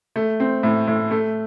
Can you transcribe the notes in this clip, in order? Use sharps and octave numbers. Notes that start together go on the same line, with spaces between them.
A3
C4
A2
A2
A3